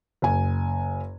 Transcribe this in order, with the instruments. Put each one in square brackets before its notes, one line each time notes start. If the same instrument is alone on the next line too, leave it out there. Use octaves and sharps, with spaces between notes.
[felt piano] F#1 G#5